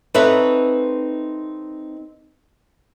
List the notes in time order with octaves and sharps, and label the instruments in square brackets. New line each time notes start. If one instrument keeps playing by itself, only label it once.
[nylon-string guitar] C4 D#4 A4 B4 C#5 E5